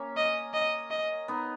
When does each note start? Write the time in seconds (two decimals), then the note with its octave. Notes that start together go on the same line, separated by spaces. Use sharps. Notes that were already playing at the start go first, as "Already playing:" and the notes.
Already playing: A#3 C#4
0.17 D#5
0.54 D#5
0.91 D#5
1.28 B3 D#4